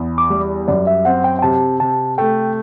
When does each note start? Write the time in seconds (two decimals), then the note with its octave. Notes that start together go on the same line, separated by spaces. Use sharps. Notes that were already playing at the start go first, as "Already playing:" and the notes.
Already playing: E2
0.18 D6
0.30 G3
0.68 F#2 D5
0.87 E5
1.05 C4 F#5
1.24 G5
1.39 G5
1.42 C3 A5
1.80 C3 A5
2.18 A3 G5